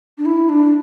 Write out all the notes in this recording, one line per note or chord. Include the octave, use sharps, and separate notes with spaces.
D4
E4
D4